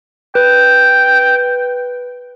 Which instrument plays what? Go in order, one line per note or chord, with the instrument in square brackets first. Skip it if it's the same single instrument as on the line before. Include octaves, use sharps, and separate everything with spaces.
[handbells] B4 [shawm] G5